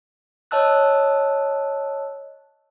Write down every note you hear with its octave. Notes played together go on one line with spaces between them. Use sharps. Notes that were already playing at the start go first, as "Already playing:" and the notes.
C#5 D#5 A5 E6 F#6